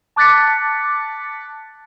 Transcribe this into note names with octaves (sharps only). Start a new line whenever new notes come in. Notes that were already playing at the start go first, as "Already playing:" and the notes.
A5 D6 F#6 A6 B6 C#7